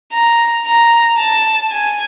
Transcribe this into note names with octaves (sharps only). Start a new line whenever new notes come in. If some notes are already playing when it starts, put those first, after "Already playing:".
A#5
A#5
A5
G#5